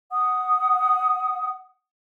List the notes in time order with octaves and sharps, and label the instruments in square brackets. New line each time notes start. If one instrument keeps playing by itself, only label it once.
[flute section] F#5 D#6